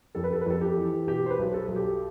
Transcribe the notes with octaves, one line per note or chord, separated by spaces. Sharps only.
F2 A4
B4
A4
B4
F2 A4
G4
E3
B2 G4
C5
B4
B1
A4
B1
G4